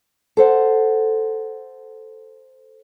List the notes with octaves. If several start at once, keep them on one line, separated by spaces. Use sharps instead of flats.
A4 C5 F#5